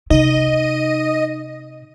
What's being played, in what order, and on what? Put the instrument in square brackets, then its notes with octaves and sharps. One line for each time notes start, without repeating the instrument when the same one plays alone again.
[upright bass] C3 [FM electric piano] D#4 [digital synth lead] D#5